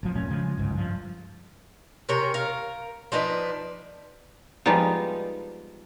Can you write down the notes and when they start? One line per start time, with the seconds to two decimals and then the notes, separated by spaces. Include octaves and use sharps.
0.03 A1 F3
0.15 E1 A#2 A3 C#4
0.30 C#3 F3 G#3
0.57 G1 C#2 G#2
0.74 G2 F3
2.09 C3 C#4 A#4
2.34 A#4 F5
3.12 F3 D4 D#4 B4
4.66 F3 G3 G#3 B3 D#4